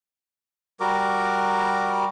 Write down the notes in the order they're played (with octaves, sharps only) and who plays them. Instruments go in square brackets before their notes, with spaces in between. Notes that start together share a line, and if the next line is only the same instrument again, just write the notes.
[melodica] G3 F#4 A#4 D6